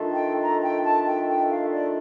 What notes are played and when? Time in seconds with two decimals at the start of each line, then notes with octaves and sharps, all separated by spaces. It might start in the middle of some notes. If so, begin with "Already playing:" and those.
Already playing: D#3 A3 D4 F4
0.13 G5
0.42 A#5
0.63 G5
0.85 A5
1.06 G5
1.28 G5
1.50 F5
1.71 D5